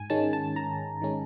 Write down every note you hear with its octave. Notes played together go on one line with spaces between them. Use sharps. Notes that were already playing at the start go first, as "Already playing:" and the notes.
Already playing: G#2 G#5
D#3 G#3 C#4 A5
A5
G#2 A#5
D#3 G#3 C#4